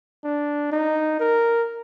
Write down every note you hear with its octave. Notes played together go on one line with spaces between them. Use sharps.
D4
D#4
A#4